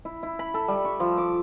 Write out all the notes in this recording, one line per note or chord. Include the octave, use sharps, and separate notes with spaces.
E4
E4
B5
A4
G3
C#6
F3
D6